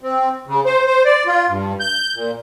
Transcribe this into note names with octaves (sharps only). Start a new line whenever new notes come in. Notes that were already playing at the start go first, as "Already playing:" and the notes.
C4
C#3
C5
C5
D5
F4
G2
G6
A#2